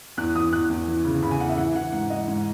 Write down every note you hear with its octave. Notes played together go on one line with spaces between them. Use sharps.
E2 F#6
E3 D#6
E2 F#6
E2
E3
C#3
C#3 B5
G#5
E2 F#5
E5
E3 F#5
E3 F#5
G#2 F#5
E3 D#5
G#2